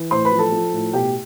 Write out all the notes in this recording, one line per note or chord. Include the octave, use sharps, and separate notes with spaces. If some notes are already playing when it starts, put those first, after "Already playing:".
Already playing: E3
A2 C5 C6
B4 B5
F3
A4 A5
F3
A2
B2 G4 G5